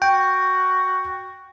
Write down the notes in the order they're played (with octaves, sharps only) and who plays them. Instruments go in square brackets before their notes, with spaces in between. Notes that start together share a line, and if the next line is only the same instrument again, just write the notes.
[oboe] F#4 [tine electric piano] G5